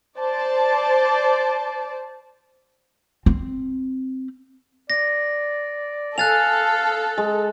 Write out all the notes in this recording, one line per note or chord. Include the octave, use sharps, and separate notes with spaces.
C5 D5 A5
C4
D5 A#6
A4 F5 G#5 F#6 A6 F7
G#3